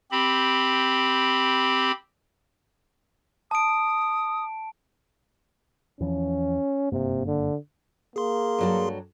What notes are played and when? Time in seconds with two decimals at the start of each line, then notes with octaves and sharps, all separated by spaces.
0.12 C4 G4 B5
3.51 A5 D#6 D7
6.00 E2 E3 F3 C#4
6.92 F#1 G2 C3 A#3
7.26 D3
8.16 A#3 G#4 C6
8.58 G2 F#3 A4